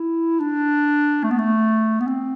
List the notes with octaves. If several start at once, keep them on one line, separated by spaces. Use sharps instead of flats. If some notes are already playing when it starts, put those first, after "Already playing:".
Already playing: E4
D4
A3
B3
A3
B3
C4